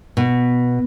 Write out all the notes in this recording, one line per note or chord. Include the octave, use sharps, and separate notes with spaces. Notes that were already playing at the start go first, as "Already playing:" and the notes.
B2